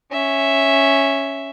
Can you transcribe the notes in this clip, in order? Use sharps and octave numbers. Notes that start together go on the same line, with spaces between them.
C#4 E5